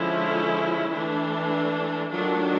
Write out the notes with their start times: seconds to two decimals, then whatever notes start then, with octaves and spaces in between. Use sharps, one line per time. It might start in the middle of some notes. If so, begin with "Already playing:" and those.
Already playing: D3 F3 G#3 C#4 E4
0.91 E3 A3 D4
2.10 D#3 F#3 A3 D4 F4